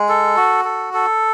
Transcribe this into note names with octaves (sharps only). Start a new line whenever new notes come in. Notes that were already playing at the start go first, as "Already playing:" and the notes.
Already playing: G#3
A4
F#4
A4
A4